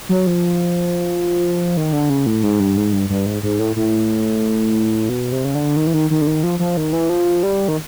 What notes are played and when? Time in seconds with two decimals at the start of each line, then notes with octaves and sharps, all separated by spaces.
0.09 F#3
0.27 F3
1.77 D#3
1.93 D3
2.10 C#3
2.26 A2
2.43 G#2
2.60 G2
2.77 G#2
2.93 G2
3.10 G2
3.26 G#2
3.43 G#2
3.59 A2
3.76 A2
5.09 B2
5.32 C3
5.45 C#3
5.55 D3
5.77 D#3
5.87 E3
5.94 D#3
6.10 D#3
6.21 D3
6.27 D#3
6.43 F3
6.59 F3
6.77 D#3
6.93 E3
7.09 F3
7.43 G3
7.68 D#3